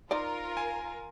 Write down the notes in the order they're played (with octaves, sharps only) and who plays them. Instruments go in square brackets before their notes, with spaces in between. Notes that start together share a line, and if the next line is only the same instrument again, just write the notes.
[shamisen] D#4 C5 D5 [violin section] F4 A#4
[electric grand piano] G#5